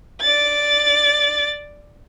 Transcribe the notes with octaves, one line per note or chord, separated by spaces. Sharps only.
D5 A6